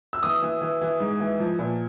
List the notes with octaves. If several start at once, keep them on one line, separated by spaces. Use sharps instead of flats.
E6
E3 D#6
E3
E3
E3
G#2
E3
F3
A#2